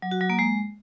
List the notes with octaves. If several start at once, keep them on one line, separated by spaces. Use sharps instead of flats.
F#3
F#4
F#3
A#3
G#3